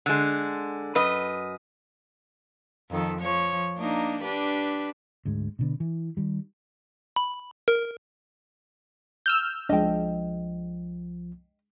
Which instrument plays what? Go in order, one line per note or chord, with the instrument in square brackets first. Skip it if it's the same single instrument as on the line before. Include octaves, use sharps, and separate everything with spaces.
[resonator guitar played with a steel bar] D3 G#3
F#2 B4 D#5
[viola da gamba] F2 D#3 A4
F3 C#5
A#3 D4 D#4
D4 G4 B4
[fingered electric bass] D2 G#2 G#3
B2 D3 B3
E3
D#3 G3
[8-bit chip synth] B5
A#4
[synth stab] E6 F6 G6
[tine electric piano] C2 F3 [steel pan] G#3 D4 [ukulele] D#5 G5